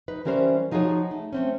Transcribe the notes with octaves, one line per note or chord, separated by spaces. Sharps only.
D#4 B4
E3 G3 C#4 A#4 C5
F3 D#4 F4 F#4 G#4 C#5
A3
A3 C4 C#4